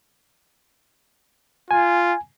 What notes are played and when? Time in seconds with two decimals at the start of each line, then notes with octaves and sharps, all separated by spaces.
1.71 F4 G#5